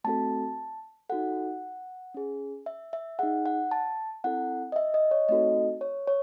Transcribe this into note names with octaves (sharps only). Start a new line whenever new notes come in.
A3 C4 F#4 A4 A5
D#4 F#4 A4 F#5
C#4 G#4
E5
E5
D#4 G#4 F#5
F#5
A5
C4 E4 A4 F#5
D#5
E5
D#5
C#5
A3 C4 D#4 F#4 A4 D#5
C#5
C#5